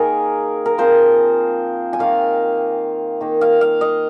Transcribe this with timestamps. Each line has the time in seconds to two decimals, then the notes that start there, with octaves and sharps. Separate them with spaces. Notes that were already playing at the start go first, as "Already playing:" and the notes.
Already playing: D#3 A#3 D#4 G#4 A#4
0.66 A#4
0.78 F3 C4 F4 C5
1.93 G#5
1.99 D#3 A#3 F4 F5
3.21 D#3 A#3 D#4
3.41 F5
3.61 F5
3.81 D#5